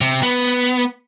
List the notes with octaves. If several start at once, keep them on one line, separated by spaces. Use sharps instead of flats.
C3
B3